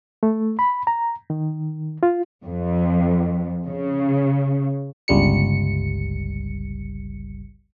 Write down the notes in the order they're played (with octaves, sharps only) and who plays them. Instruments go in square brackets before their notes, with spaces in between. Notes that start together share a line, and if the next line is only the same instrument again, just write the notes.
[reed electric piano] A3
B5
A#5
D#3
F4
[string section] F2
C#3
[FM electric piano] G1 C#2 G3 C#7